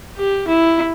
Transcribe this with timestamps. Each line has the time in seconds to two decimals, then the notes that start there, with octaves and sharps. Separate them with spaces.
0.17 G4
0.48 E4